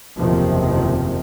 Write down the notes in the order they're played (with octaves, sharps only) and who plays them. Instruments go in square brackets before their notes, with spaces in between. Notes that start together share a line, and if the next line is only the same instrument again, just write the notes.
[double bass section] F#1 E2 C3 D#3 F3